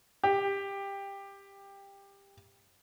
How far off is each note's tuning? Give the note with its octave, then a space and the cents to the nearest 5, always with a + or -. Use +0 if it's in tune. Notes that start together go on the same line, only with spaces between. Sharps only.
G4 +15